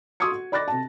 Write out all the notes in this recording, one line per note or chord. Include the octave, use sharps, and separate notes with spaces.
C6 C#6 D#6 E6 G#6 C#7
F#4
D5 B5 D6 F#6 A6 A#6
C3 A5